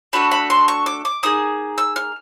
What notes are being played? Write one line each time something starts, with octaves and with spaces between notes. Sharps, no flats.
A3 D4 F#4 A4 B5
B5
C6
C#6
D6
D6
A#3 D#4 G#4 D#6
E6
F6